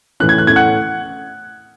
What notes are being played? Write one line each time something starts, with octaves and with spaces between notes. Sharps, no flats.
A2 E3 A3 C#4 F#6
G#6
F#6
A2 E3 A3 C#4 G#6
F#5 F#6